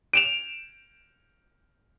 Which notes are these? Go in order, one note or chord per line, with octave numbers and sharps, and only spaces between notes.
D7 E7 F7